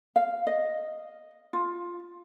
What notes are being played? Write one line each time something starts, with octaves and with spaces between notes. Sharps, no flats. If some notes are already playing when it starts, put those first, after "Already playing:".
F5
D#5
F4